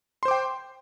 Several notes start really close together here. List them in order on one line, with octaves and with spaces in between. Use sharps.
C6 C5 D6 G5